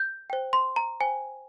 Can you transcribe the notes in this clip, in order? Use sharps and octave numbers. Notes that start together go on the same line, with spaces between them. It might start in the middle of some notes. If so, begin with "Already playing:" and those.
Already playing: G6
C5 G5
C6
A#5
C5 G5 G#5